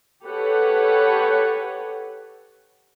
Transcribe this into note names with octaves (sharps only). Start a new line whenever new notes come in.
G4 A4 B4 C#5 F#5